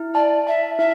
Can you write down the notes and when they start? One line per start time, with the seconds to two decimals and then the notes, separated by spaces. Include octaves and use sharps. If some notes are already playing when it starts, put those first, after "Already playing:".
Already playing: E4
0.14 D5 A5
0.47 E5 A5
0.78 E4 E5